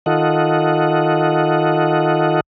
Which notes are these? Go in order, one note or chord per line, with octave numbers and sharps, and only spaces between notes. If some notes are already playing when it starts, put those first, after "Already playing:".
D#3 F4 A4 D#5 F#5